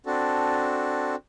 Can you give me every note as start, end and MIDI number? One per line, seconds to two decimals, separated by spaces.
0.06 1.16 60
0.06 1.16 62
0.06 1.16 66
0.06 1.16 69